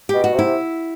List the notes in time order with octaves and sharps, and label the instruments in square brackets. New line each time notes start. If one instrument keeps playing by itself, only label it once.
[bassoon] B2 [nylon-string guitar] G4
[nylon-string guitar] F#4
[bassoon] C3 [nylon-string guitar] E4